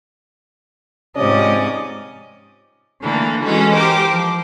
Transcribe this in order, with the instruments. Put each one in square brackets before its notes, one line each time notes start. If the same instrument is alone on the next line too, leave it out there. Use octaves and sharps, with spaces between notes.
[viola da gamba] G#2 D5 D#5 [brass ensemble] C3 F3 C#4
[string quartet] D3 E3 A3 A#3
E3 G#3 C#4 F#4 A4
G4 A#4 C5 D6
F3